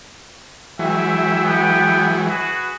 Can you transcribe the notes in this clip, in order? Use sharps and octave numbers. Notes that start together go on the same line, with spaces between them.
E3 F#3 G#3 E5 G5
B3 G5
F#4 G#4 B4